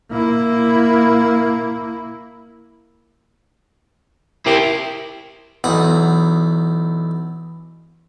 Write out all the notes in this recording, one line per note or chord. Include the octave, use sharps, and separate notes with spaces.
A#3 E4
E4 G4 A#4 C5
B1 E2 F#5 A#5 D#6